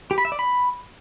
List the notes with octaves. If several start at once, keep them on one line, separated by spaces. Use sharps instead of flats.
G4
B5
E5
D5
B5